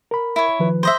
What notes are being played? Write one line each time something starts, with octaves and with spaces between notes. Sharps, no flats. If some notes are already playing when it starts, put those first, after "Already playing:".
A#4 B5
E4 C#5
D#3 F3 B4
C5 D#5 E5